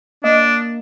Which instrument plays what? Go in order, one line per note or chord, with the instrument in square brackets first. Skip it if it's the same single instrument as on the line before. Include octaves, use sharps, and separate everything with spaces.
[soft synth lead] A#3 [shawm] D4 [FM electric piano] D#5